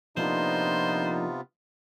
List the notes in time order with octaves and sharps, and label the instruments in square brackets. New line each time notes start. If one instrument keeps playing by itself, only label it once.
[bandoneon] C3 B3 F4 [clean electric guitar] F3 A#3 D4 [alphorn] D#4 [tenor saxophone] C5